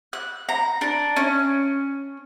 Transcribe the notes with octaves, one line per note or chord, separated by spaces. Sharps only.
F#6
A#5
D4
C#4